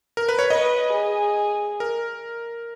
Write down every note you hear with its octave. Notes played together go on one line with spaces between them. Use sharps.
A#4
B4
C#5
B4 D#5
G#4
A#4